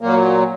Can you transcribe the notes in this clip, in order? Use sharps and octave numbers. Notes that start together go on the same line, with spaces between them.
A#2 F#3 A#3